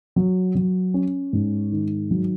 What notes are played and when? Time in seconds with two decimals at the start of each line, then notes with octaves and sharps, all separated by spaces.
0.16 F#3
0.55 F#3
0.94 C#4
1.33 G#2
1.72 D#3
2.11 F#3